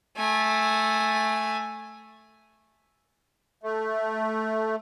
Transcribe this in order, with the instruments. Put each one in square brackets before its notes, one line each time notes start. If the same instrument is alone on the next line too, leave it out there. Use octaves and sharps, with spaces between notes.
[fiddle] A3 G#5
[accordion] A3